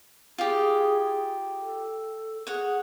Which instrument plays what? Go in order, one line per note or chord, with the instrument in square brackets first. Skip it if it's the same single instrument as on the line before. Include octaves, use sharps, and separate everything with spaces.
[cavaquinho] F4 G4 [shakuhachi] G#4
[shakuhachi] A4
[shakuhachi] G#4 [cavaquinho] C#5 F#5